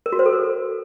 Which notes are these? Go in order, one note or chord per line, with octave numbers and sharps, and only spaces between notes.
A#4
F#4
C5
A4
A#4